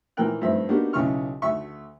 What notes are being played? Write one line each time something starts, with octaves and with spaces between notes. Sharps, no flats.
A#2 E3 F3 A#4 G5 F#6
G2 F3 A3 C4 E5
A#3 B3 D4 D#4 F#4 G4
B1 C#3 E4 C#6 F6
D2 A3 E5 C#6